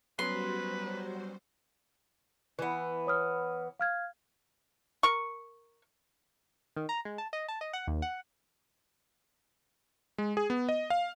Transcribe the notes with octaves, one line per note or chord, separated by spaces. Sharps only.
F#3 G3 B3 C#4 F#4 B4 C5 C6
E3 B3
C#5 D#6 F6
F5 F6 G#6
A#4 C#6
D#3
A#5
G#3
A5
D#5
A5
D#5
F#5
D#2
F#5
G#3
G#4
B3
D#5
F5